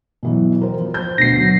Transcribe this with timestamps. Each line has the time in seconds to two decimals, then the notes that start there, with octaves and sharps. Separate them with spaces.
0.23 B2 E3 F#3
0.62 A#4 C5
0.80 F3
0.94 C5 G6
1.18 D2 B2 A#6 C7
1.38 F#3